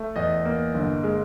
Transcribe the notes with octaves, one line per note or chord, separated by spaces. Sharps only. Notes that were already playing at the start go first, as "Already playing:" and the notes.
Already playing: A3
E2 D#5
A#3
G1
G#3